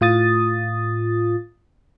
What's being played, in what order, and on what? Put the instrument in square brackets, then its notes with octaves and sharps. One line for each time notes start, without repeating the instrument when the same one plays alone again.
[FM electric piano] A2 F4 D#6 A6